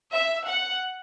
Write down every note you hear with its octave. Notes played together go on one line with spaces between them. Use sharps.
E5
F#5